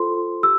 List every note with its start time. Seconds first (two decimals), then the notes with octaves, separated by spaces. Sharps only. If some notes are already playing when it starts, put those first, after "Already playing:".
Already playing: F4 A4 C5 C6
0.43 G4 E6